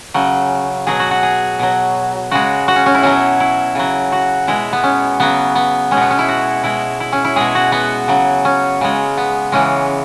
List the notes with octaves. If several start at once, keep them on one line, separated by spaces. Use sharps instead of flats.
C#3 F#3
B2 F#3 G#4
F#4
F#4
G#4
B2 F#3
C#3 G#3 F#4
F#4
C#4
C#4
E4
B2 F#3 C#4
E4
C#3 F#3
F#4
B2 G#3 E4
B3
C#4
C#3 F#3 B3
B3
G#3 C#4
B2 B3
C#4
E4
F#4
B2 G#3 E4
E4
C#4
E4
B2 G#3 G#4
F#4
B3
C#3 F#3
C#4
C#3 G#3
B3
C#3 E3 G#3 C#4